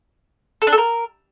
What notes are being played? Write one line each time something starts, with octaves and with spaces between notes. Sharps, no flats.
A4
D4
A4
A#4